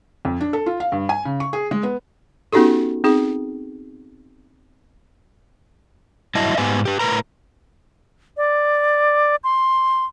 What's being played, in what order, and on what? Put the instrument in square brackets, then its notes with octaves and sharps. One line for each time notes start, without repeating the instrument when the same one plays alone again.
[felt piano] F2
D4
A4
F4
F5
G2
G#5
C#3
C#6
G#4
G#3
B3
[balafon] B3 C#4 D#4 F#4 G4 A4
C4 D#4 G#4
[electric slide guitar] G2 F#3 E4 D#5 E5 A5
G#2 B3 G4 G#5
G4 B4
A2 A#4 B4 A#5
[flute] D5
C6